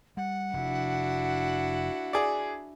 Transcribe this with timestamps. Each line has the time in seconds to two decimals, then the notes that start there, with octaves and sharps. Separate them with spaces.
0.17 G3 F#5
0.54 F1 D4 E4 F#4
2.13 G#4 D5